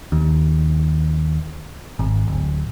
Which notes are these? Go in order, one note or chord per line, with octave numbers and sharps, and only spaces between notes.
D#2
G#1
D1